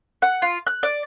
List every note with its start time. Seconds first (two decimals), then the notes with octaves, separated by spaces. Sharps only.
0.22 F#5
0.42 F4
0.67 F#6
0.83 D5